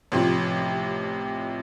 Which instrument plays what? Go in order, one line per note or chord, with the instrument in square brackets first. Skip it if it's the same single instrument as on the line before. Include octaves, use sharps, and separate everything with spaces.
[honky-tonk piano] A1 C3 F3